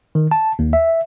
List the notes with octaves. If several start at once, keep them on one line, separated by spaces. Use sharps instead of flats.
D#3
A5
D#2
E5